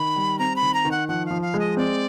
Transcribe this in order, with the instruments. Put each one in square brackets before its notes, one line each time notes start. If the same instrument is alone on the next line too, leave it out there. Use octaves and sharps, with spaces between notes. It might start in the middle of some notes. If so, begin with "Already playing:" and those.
Already playing: [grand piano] D#3 [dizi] B5
[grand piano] G3
[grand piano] C4 [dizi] A#5
[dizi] B5
[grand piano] D#3
[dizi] A#5
[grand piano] D#3
[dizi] F#5
[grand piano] F3 [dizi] F#5
[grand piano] F3 [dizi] F5
[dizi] F5
[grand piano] G#3
[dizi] D#5
[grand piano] C4 [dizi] D5